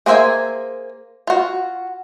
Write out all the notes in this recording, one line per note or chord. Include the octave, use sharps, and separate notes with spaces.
A#3 G#4 C5 E5 G#5
F4 F#4